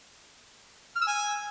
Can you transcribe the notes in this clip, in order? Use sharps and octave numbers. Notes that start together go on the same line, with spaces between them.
F6
E6
G#5